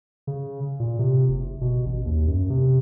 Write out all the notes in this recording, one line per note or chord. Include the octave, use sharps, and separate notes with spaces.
C#3
A#2
C3
F#1
B2
A1
D#2
F#2
C3